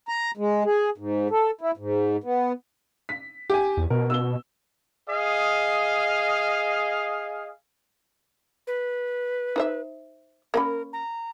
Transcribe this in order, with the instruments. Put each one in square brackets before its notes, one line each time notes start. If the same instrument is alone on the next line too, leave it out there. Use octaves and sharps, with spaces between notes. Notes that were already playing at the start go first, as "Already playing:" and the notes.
[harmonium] A#5
G#3
G#4
G#2
A4
E4
G#2
B3
[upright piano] B6
G4 G#5
[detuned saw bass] E2
[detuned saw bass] B2 [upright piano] A#4
[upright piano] E6 G7
[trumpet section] G#4 D#5 F5
[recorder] B4
[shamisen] D#4 C5 E5
[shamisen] A#3 C#4 B5 [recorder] A#4
[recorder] A#5